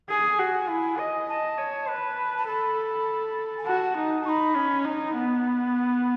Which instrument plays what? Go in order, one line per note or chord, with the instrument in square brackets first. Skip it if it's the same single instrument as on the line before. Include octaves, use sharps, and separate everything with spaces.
[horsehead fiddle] G#4 [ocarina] G#5
[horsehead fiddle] F#4
E4
D#5
[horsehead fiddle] D#5 [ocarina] A5
[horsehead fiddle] C#5
B4
[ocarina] A5
[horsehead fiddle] A4 [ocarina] B5
[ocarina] G#5
[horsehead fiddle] F#4 [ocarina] A5
[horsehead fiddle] D#4
[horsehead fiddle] D#4 [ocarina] B5 C#6
[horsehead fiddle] C#4
D#4
B3